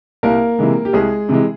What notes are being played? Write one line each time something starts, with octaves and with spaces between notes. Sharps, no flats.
C2 A#3 A#4
C3 E3 G#3
G4
C2 G#3 G#4
C3 E3 G#3